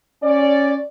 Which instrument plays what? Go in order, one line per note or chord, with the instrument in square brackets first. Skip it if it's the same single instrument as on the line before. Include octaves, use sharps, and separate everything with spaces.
[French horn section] C#4 D5